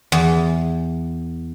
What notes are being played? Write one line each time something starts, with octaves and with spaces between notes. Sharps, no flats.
E2